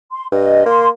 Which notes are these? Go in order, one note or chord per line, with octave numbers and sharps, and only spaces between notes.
C6
G2 D#5
A#3 C6